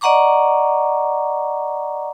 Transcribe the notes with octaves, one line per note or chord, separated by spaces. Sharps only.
D5 D#5 F#5 A#5 C#6 D6